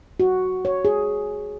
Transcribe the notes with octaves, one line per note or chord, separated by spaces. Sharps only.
F#4
C#5
G#4